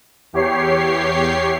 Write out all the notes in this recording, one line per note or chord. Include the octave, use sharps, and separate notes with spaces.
E2 G4 C#5 C7